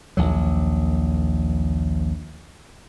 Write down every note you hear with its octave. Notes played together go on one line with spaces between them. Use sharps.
A#1 D#2 F#3